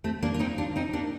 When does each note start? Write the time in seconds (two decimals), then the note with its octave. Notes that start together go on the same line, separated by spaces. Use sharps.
0.04 A3 C4
0.22 A#3 D4
0.34 F4
0.39 C4 D#4
0.58 D4 F4
0.76 C4 D#4
0.93 A#3 D4